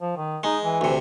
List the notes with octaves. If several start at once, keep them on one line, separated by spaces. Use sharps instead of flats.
F3
D#3
G#3 D#4
E3
D2 C3